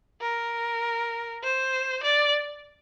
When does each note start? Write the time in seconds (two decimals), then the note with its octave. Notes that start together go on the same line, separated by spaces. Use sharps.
0.21 A#4
1.43 C5
2.03 D5